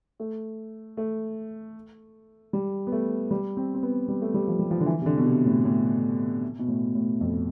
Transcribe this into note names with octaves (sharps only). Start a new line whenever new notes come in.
A3
A3
G3
B3
A3
G3
C4
C4
B3
G3
A3
G3
F3
G3
F3
D3
E3
C3
D3
B2
C3
A2
A2
B2
A2
A2
F2